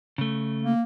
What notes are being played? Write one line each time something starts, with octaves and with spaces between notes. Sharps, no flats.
C#3 A3
A#3